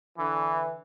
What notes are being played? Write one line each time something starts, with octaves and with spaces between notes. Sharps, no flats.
D3 E3